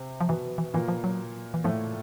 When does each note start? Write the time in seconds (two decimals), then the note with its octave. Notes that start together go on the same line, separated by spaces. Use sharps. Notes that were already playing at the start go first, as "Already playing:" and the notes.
Already playing: C3 C4
0.21 F3
0.29 B2 E3 B3
0.58 E3
0.74 A#2 E3 A#3
0.88 F3
1.04 F#3
1.54 E3
1.64 A2 F3 A3